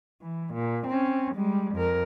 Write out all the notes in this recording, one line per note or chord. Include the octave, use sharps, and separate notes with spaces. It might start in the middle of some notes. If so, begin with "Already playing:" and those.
E3
A#2
C4 C#4
G3 G#3
F2 A#4